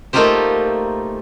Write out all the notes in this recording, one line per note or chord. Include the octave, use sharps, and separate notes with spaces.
A3 A#3 D#4 F4 G4 C5